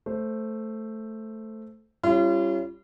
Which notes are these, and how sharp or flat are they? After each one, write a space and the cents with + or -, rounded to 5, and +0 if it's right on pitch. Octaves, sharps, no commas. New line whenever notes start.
A3 +0 C5 +0
G3 +0 C#4 -15 F4 -40